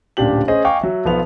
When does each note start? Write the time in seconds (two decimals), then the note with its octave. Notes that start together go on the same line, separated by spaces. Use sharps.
0.17 D1 A#2 C#3 D4 G4 F#7
0.48 C#4 G#4 C5 D#5
0.64 D#5 F5 G5 G#5 C#6 D6
0.81 F#3 E5
1.05 B1 F3 B3 F7